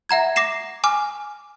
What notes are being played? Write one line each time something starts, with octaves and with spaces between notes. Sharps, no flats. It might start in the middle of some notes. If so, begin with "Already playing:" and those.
E5 F#5 A#5 G#6
D6 A#6 C7 E7
G#5 D6 F6